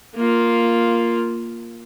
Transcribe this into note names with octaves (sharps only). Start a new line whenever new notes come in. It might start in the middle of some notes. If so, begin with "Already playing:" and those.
A#3 F4